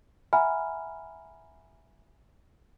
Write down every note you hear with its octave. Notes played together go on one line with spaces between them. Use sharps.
E5 F#5 G#5 A#5 B5 F6